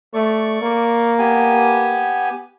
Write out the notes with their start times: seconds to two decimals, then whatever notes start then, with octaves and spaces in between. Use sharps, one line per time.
0.14 A3 D5 C#6
0.62 A#3
1.19 B3 G4 G#5